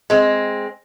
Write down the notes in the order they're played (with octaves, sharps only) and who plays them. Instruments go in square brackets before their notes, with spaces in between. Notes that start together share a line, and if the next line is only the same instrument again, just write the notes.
[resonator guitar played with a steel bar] G#3 C4